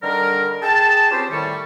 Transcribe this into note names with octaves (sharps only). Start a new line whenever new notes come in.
D3 D#3 G3 D4 A#4
G#4 G5 A5
C4 C#4 F4 G4 B4 C5
A2 D#3 G3 C#6